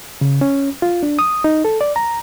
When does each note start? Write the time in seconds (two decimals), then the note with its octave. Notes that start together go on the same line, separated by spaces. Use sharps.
0.21 C#3
0.41 C#4
0.82 F4
1.03 D4
1.19 D#6
1.44 D#4
1.65 A4
1.81 D5
1.96 A#5